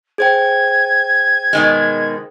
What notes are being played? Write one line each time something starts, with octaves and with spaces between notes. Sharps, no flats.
G#4 C5 G5 G#6
B2 D#3 G#3